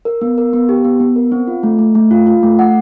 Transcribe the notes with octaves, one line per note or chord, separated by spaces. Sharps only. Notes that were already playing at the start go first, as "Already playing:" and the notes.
A#4
B3
A#4
B3
G4
B3
B3
A#4
C4
F4
A3
A3
A3
F4
F4
A3
F#5